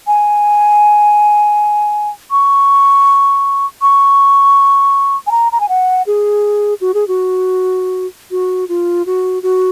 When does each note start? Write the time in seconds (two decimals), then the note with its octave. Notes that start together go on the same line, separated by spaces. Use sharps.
0.07 G#5
2.31 C#6
3.82 C#6
5.27 G#5
5.31 A#5
5.52 A#5
5.60 G#5
5.69 F#5
6.07 G#4
6.81 F#4
6.94 G#4
7.08 F#4
8.31 F#4
8.69 F4
9.06 F#4
9.43 F#4